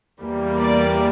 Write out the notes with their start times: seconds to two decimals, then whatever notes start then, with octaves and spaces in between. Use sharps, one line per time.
0.20 E2 E3 G3 A#3
0.60 D5